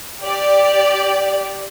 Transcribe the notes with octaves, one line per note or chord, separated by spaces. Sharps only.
G4 D5